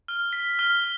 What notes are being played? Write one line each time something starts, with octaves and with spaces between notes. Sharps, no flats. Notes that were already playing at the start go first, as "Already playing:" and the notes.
F6
B6
F6